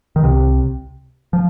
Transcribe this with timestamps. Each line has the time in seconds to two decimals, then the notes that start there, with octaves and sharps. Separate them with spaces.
0.16 D#3
0.23 C2 C3
1.33 F3